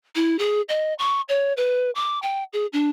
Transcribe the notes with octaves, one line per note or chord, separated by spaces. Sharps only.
E4
G#4
D#5
C#6
C#5
B4
D6
G5
G#4
D4